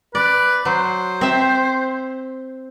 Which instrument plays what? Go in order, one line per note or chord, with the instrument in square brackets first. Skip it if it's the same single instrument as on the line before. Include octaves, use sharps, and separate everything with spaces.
[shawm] B4 [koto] D5
[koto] F#3 [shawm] C5
[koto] C4 E5